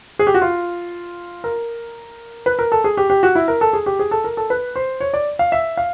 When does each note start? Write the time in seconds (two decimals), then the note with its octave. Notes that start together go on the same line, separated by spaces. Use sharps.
0.19 G#4
0.27 G4
0.34 F#4
0.42 F4
1.44 A#4
2.46 B4
2.59 A#4
2.72 A4
2.84 G#4
2.97 G4
3.10 G4
3.23 F#4
3.35 E4
3.48 A#4
3.61 A4
3.73 G#4
3.86 G4
3.99 G#4
4.11 A4
4.24 A#4
4.37 A4
4.50 B4
4.76 C5
5.00 C#5
5.14 D5
5.39 F5
5.52 E5
5.77 F5